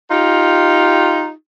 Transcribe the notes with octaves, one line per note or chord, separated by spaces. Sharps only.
D#4 F4 G4